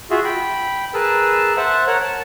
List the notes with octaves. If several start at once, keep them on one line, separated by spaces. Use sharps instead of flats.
F4 F#4 G#4 E5
G5 B5
G#4 A#4 B4 A5 E6
C5 E5 F#5 A5
A#4 C#5 F#5
A5